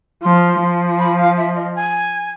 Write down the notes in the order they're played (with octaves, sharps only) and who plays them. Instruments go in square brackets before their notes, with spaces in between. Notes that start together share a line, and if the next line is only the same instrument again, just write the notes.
[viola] F3 [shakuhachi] C6
[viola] F3
[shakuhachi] B5
F5
E5
D#5
G#5